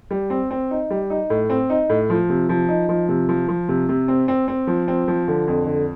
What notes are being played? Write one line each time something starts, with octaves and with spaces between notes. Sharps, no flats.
G3
C4
C4
D#4
G3
D#4
A2
C4
D#4
A2
F3
C3
F3
D#4
F3
C3
F3
F3
C3
C3
C4
C4
C4
F3
C4
F3
D3
F2
D3